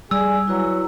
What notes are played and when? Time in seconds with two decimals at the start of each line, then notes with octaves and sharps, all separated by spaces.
0.11 G3 G#4 D5 E6
0.47 F#3 E4 F#4 B4